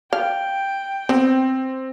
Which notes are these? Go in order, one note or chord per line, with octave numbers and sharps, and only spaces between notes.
F5 G5
B3 C4